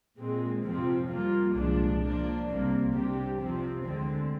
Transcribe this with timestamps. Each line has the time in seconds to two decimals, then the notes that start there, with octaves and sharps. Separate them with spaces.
0.18 A#2 G#3 C4
0.64 F2 C3 F3 C4
1.10 G3 A#3 F4
1.55 C2 A#2 F3 G#3 D4
2.01 F3 A#3 D4
2.47 C2 C3 G3 A#3
2.92 C3 G3 D4 G4
3.38 F2 C3 F3 C4
3.84 D2 D3 G#3 C4